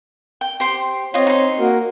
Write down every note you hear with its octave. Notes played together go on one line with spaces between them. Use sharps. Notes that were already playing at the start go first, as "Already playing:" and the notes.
G5
G4 C5 C6
C4 F4 C#5 D#5
D#4 C6
A#3 F#4 A#4